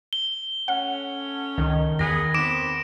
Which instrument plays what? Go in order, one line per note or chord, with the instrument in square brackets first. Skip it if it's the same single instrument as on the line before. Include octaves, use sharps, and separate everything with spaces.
[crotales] G7
[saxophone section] A3 C#4 [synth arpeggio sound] F#5
[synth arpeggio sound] C#2 [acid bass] D#3
[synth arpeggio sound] E2 [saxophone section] B3 G#4 [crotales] A#6
[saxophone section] B3 C4 [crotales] D6 D7 E7